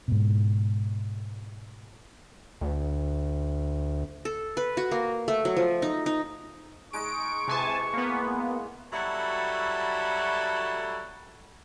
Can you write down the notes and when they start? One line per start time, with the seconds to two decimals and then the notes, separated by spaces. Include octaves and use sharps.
0.08 G#2 B2
2.61 D2
4.25 A4
4.57 B4
4.77 F#4
4.91 A#3
5.28 A3
5.45 F#3
5.56 F3
5.82 D#4
6.06 D#4
6.93 G#3 D#4 D#5 C#6 D7
7.48 C3 E3 G#3 G#5 A5
7.93 A#3 B3
8.93 F#3 G3 E4 F#4 A4